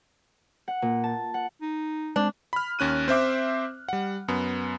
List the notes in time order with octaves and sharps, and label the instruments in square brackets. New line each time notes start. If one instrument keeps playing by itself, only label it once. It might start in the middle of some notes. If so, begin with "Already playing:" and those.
[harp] F#5
A#2
A5
F#5
[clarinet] D#4
[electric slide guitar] G#3 C4 C5 [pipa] D4
[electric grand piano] B5 F6
D#2 C#4 F#6 D#7
C4 C5 E5 D6
G3 F#5
F#2 B3